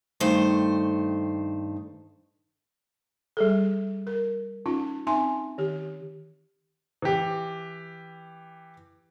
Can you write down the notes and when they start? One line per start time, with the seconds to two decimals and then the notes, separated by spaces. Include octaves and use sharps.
0.20 G2 D#3 A3 C5
3.37 G3 G#4 A4
4.07 A#4
4.66 C#4 D#4 F4
5.07 C4 D#4 E5 G#5 C6
5.58 D#3 G4
7.02 E3 G4